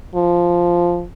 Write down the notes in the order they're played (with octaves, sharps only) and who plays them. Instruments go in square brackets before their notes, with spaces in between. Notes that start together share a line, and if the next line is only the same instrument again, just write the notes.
[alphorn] F3